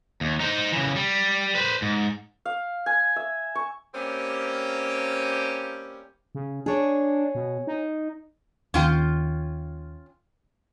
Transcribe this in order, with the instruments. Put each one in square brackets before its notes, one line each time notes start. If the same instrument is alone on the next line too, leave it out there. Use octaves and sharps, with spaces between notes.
[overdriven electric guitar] D#2
D#4 C5
C#3 E3
G3
B4 C5
G#2
[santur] F5
G#5
E5
C#6
[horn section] G3 A#3 C4 C#4 G4
[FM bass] C#3
[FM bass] D4 [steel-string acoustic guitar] G#4 C#5
[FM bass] B2
D#4
[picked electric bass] D#2 D#3 [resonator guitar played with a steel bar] C#4 F4 G5